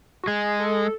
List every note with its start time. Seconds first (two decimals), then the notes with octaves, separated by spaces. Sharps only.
0.23 F#4
0.27 G#3 G#4
0.60 A4